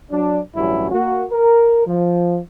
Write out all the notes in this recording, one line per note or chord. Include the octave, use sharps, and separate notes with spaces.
F#3 D4
A1 G2 F#3 C#4 E4
A#3 F#4
A#4
F3